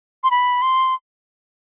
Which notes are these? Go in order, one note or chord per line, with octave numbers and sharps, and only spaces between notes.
C6
B5
C6